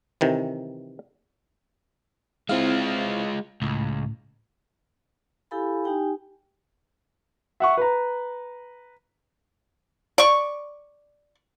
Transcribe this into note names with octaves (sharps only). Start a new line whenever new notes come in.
C3 D#3 E3
G#3 C4 E4 F4 F5
C#2 A2
E4 G4 A4 F5 G#5 B5
D#4 G4 G5 G#5
E5 F#5 C#6
B4 A#5
D5 C#6